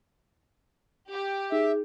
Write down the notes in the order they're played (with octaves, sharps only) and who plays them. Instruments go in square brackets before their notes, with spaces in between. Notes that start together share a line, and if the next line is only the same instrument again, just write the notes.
[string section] G4
[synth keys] D#4 [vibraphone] G#4 [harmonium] E5